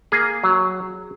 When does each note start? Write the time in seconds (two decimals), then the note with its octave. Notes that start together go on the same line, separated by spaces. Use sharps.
0.12 A#3 G#4
0.44 F#3